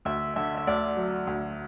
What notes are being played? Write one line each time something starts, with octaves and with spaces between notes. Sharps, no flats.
D2 E5
D3 E5
E5
D2 D5
F#3
D2